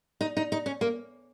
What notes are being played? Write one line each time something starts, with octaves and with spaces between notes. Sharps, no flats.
D#4
D#4
D#4
C#4
A#3